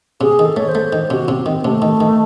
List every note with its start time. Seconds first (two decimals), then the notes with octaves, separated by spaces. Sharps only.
0.21 C3 G#4
0.39 D#3
0.45 A4
0.57 A3 C#5
0.68 C5
0.75 A3
0.93 D#3
1.10 C3 F#4
1.28 C3 C4
1.46 D#3 C4
1.64 C3 A3
1.82 D#3
2.00 D#3